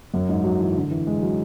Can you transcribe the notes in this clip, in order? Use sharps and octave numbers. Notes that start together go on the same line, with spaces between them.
F#2
G#2
F#3
E3
D3
E3
G#3
F#3